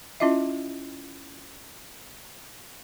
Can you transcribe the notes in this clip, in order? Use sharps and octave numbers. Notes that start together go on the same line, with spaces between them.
C#4 E4 F4 D#5 E5